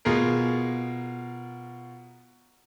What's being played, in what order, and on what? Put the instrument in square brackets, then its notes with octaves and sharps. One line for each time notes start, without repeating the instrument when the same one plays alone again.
[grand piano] B2 F4 G#4 A#4